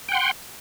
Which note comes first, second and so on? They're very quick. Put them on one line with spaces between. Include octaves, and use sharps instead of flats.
G5 F#5 C6